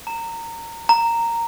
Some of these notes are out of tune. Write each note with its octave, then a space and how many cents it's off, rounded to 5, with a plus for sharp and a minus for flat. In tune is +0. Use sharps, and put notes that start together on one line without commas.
A#5 -20
A#5 -10